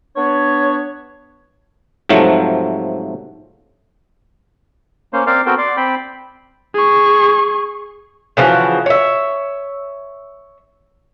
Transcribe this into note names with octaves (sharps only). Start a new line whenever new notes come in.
B3 D4 C#5
G#2 C3 F3 F#3 A3
A#3 C#4 C5
C4 A#4 C5 D5 F5
B3 C4 F#4 A4 A#4 G5
D5 C6
C4 G5 B5
G#4 C#6
C#3 E3 F3 F#4
C#5 E5